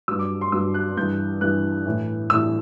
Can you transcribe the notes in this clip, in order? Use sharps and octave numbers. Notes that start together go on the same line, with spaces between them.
G2 F#3 E6
D6
C6
G2 F#3 E6
F#6
G2 E3 G6
G2 E3 F#6
A2 E3
A2 E3 E6